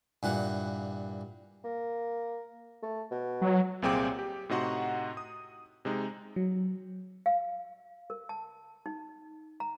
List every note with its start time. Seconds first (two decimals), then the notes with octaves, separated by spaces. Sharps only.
0.23 G2 A#2 E3 F#5
1.64 A#3
2.83 A3
3.11 B2
3.41 F#3
3.82 C2 A#2 C4 G#4 G5 D6
4.19 G4
4.49 A2 C3 D#4 F#4 F#5 C6
5.17 D#6
5.85 C3 G#3 D#4
6.36 F#3
7.26 F5
8.10 A#4
8.29 A5
8.86 D#4
9.60 A#5